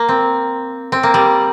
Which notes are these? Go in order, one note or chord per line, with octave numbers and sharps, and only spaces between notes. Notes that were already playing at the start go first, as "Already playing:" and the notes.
Already playing: A#3
C4
C4
A#3
G3